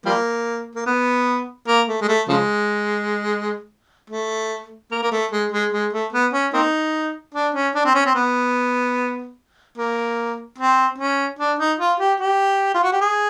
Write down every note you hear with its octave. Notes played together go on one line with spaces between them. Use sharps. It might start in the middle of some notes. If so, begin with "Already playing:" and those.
F3 G3 A#3
A#3
B3
A#3
A3
G#3
A3
C#3 F3 G#3
A3
A#3
A#3
A3
G#3
G#3
G#3
A3
B3
C#4
A#3 C4 D#4
D4
C#4
D4
C4
C#4
C4
B3
A#3
C4
C#4
D4
D#4
F4
G4
G4
F4
F#4
G4
G#4